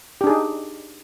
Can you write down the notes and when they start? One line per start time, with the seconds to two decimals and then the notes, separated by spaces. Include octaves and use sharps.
0.21 G4
0.24 D4
0.27 G#4
0.30 D#4